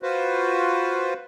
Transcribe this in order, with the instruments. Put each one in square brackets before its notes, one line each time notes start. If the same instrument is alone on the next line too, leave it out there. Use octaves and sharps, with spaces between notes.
[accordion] F4 F#4 B4 C5